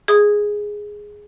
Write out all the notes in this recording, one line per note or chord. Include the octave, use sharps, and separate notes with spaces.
G#4 D#6